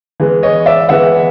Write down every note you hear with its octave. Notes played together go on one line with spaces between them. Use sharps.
E3 G#3 B3
C#5 D#5
D5 E5
E3 G#3 B3 E5 F#5